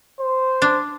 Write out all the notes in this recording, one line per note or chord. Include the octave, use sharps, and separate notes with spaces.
C5
D4